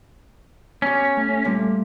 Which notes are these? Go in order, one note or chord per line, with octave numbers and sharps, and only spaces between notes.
B3 C#4 G4
A3
A#2 G3 A3